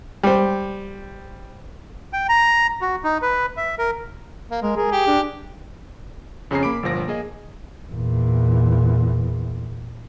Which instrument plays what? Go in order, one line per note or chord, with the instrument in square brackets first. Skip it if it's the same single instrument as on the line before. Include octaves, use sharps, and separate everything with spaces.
[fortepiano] G3 C5
[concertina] G5
A#5
F#4
D#4
B4
E5
A#4
[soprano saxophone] A#3
[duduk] G#3 [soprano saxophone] A#4
[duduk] G#4 [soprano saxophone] A#4
[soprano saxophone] G4
[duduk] D4
[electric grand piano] F2 C#3 C#4 G#4 A#5 C7
A#3 B5 D6 D7
G1 A#2 F3 A#6
A#3 G#4 D#5
[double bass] E2 A#2